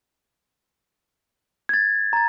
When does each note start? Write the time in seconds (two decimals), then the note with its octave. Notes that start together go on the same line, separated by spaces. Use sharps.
1.69 G#6 A6
2.13 A#5 A6